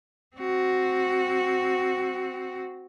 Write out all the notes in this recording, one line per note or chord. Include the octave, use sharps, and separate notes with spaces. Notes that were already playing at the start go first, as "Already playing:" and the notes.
C4 F#4